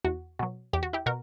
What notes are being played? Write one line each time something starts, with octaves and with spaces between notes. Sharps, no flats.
E2 F#4
B2 F#3
E2 G4
F#4
E4 G4
B2 F#4 A#4